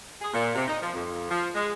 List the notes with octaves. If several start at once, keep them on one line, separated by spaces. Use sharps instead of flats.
G#4
A#2
C3
D#4
F3
F2
F3
G#3